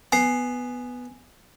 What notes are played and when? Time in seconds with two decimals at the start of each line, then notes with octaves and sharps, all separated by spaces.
0.12 B3 G#5 C7